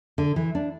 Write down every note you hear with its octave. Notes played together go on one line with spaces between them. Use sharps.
D3
E3
D4